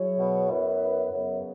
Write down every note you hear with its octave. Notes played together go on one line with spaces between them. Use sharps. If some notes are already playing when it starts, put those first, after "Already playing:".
Already playing: F#3 E4 G#4 C#5
B2
F#2 B3 E4 B4
F#2 C#3 F#3 B3